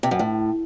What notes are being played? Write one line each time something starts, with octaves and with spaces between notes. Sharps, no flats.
C3
F#2
A2